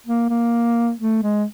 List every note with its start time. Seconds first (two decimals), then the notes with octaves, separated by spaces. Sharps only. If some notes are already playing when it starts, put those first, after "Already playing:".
0.06 A#3
0.29 A#3
0.99 A3
1.23 G#3